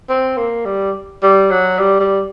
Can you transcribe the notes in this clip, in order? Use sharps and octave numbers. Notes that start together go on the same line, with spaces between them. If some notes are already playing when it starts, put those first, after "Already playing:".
C4
A#3
G3
G3
F#3
G3
G3